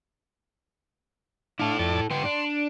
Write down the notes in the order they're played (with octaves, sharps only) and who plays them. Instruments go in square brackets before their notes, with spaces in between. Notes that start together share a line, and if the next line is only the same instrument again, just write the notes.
[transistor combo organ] D4 F5 [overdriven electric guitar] E4 A4
[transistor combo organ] F2 D5 A5
[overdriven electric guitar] B3 G4 [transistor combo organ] C6
[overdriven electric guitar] D4